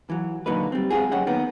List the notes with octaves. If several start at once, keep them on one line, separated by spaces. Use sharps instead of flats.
E3 F#3
A#2 D3 F#3 A#3 D#4 B4
G3 C4
G#3 C4 D4 F4 F#4 G#4
F#2 D3 C#4 D#5 F#5 G5
D#3 A#3 B3